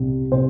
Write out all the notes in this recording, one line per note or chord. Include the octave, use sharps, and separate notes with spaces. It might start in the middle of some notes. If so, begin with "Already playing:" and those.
Already playing: C2 C3
C3 C5